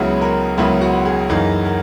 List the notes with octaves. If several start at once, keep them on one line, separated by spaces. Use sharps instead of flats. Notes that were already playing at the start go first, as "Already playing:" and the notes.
Already playing: C#2 C#3 F#3 B3 E4 G#4
A#4
C#2 C#3 F#3 B3 E4 A#4
F#4
G#4
F#2 E3 A#3 D#4 G#4
A#4